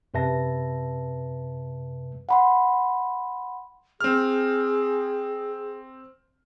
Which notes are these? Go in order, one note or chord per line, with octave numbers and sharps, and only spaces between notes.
F#2 C3 B4 E5 A5 A#6
F#5 B5 C6
C4 G#4 F6